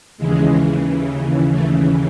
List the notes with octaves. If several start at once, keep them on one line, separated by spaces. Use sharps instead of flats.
D#2 C#3 E3 G#3
A3